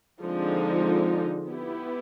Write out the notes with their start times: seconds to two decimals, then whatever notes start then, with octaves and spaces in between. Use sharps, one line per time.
0.22 D3 F3 G#3 C4 D#4
1.48 B3 E4 G4